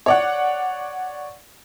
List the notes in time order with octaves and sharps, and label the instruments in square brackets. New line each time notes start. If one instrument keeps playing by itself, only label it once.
[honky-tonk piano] C#5 D5 F#5